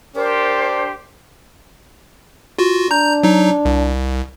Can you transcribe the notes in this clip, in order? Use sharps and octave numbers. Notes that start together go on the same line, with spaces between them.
D4 G4 A#4 C5
F4 F#4
D4 A#5 G6
F#3 D#4
C2